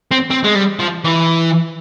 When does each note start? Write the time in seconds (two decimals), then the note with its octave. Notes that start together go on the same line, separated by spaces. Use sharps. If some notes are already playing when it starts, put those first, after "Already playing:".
0.11 C4
0.31 C4
0.44 G#3
0.55 G3
0.79 F3
1.04 E3